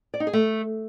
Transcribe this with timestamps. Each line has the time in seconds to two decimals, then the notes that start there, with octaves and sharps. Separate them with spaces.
0.14 D5
0.20 D#4
0.27 G#4
0.33 A3